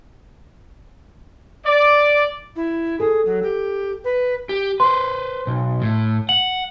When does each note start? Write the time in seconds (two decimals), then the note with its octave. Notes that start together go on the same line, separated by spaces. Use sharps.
1.65 D5
2.56 E4
3.00 G#4 A4
3.25 F#3
3.43 G4
4.04 B4
4.49 G4
4.80 B4 C5 C6
5.47 B1
5.82 A2
6.29 F#5 F#7